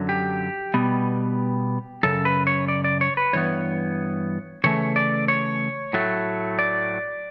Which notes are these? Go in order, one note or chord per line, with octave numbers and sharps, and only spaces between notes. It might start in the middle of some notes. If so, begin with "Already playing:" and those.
Already playing: F#2 D3 F#3
G4
B2 G3 B3
F#2 C#3 A4
B4
C#5
D5
D5
C#5
B4
G2 E3 B3 C#5
C#3 E3 A3 C#5
D5
C#5
A2 F#3 A3
D5